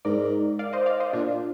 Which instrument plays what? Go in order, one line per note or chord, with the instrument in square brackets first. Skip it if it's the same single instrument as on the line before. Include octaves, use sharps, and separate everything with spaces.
[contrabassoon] G#2 [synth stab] A#4 D5
[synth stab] D5 F5
C5 D#5
D5 F5
C5 D#5
[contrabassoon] A#2 [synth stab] D4 F4